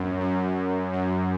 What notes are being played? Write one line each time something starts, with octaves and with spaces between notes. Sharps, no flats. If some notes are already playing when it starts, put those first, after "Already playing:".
Already playing: F#2
F#2
F#2